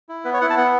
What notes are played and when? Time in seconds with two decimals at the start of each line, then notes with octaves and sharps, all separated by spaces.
0.09 E4
0.25 B3 B4
0.33 C#5
0.41 E4 F#5
0.50 A5
0.57 B3 F#5